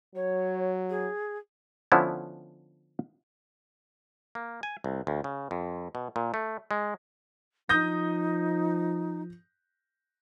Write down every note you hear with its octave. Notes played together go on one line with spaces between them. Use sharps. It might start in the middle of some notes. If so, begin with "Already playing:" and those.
F#3 C#5
G#4
D3 F3 B3 C#4 E4
A#3
G#5
C2
D2
C#3
F2
B2
A#2
A3
G#3
F3 D#4 D#6 G6 A#6